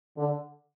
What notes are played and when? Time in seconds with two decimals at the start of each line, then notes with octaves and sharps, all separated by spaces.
0.17 D3